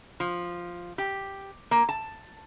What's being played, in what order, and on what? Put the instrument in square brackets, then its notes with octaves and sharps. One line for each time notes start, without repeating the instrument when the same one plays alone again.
[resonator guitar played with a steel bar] F3
G4
A#3
A5